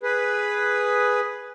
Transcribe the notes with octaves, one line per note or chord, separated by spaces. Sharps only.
G#4 B4